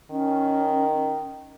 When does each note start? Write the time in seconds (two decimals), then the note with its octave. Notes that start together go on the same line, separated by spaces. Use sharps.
0.11 D#3 C#4